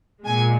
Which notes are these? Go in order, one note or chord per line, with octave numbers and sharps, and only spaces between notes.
A#2 G#3 G#5